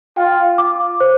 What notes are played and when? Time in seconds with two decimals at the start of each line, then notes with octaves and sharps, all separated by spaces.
0.17 F4 G5
0.58 D6
1.00 C5